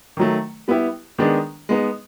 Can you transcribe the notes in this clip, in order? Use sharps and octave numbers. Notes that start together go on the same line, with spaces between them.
D#3 F#3 A3
G3 B3 E4 G4
D#3 G#3 B3 D4
G#3 B3 D#4